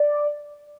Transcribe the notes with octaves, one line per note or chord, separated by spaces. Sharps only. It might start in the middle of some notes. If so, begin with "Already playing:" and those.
Already playing: D5